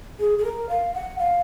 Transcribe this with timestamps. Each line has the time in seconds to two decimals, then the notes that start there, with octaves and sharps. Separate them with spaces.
0.19 G#4
0.38 G#4
0.44 A#4
0.69 F5
0.94 F#5
1.19 F5